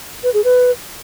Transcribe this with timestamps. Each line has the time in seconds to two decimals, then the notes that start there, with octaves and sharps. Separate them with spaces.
0.24 B4
0.34 G#4
0.44 B4